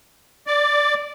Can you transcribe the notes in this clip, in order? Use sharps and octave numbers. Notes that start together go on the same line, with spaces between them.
D5